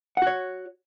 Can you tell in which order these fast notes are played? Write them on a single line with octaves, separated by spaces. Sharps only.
F#5 F#4 C#5